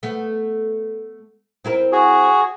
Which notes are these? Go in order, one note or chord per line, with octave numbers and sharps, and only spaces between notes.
A3 B3
C4 E4 A#4
F#4 G#4